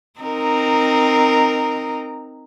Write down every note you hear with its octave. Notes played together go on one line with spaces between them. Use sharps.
C4 D#4 A#4